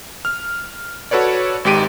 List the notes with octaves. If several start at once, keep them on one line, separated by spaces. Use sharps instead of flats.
F6
F#4 A4 B4 C#5 D5
G#1 G#2 G4 D7 D#7